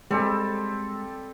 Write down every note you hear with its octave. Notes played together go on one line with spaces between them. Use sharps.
G3 G#3 C4 A4